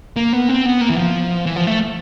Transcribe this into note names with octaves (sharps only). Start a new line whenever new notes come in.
A#3
B3
C4
B3
A#3
E3
F3
E3
F3
A3